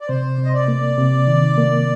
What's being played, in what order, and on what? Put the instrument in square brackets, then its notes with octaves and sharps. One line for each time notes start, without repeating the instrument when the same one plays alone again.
[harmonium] D5
[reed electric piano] C3 [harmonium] C5
[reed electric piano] C3
[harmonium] D#5
D5
[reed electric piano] A#3
C3
D#3
A#3